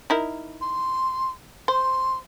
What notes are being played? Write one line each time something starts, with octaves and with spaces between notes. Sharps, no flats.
D#4 E4 A#4
C6
C5 C6